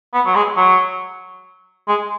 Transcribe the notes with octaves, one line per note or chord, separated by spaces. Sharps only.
B3
F#3
G#3
F#3
G#3